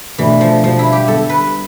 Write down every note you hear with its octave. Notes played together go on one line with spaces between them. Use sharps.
B2 E3 A3 D4
F3
B2 F3 G3 D4
E4
G4
D3 G3 B3 A4
B4